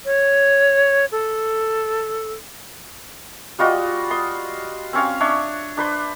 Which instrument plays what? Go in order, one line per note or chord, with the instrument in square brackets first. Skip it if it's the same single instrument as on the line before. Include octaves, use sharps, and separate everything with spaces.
[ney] C#5
A4
[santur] G3 F4 F#4 D#5
C6 D#6
C4 C#4 F5
D4 C#5 E5
D4 B4 C5